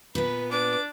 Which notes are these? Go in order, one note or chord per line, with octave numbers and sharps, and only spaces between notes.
A#2 B3 B4
D4 B4 D6